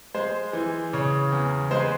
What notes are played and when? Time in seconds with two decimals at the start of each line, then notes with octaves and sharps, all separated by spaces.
0.14 G#3 C5
0.53 E3
0.93 C#3 C#5
1.32 E2
1.71 G#3 C5
1.80 B4